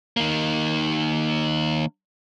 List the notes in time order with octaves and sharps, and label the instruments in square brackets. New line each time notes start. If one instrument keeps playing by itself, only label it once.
[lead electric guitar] D#3 A#3